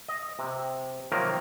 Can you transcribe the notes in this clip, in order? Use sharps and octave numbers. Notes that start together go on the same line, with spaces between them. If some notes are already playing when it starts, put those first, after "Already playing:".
D#5
C3
C3 D#3 F3 F#3 A#3 A#4